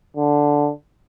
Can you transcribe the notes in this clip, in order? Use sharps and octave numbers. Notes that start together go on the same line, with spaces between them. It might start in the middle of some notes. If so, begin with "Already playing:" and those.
D3